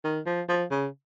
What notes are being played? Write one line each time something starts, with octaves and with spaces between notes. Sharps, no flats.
D#3
F3
F3
C#3